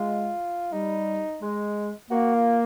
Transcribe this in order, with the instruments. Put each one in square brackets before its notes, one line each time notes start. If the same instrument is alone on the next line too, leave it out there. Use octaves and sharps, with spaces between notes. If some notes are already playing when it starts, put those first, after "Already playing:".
Already playing: [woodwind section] G#3 [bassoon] F4
[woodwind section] G3 [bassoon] D#4
[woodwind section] G#3
[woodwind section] A#3 [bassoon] F#4
[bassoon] F4